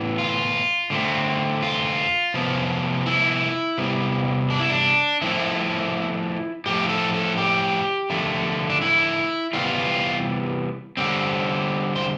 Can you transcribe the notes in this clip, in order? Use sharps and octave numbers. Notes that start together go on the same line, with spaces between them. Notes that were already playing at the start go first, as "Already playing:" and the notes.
Already playing: A2 E3 B3
F4
D3 A3 C4
F4
C3 F3 B3
E4
C3 G3 B3
D4
E4
D4
D3 F3 A3 C4 E4
A2 F3 A3 G4
A4
A4
G4
D3 F3 A3
D4
E4
C3 E3 G3 B3 F4
D3 G3 C4
C5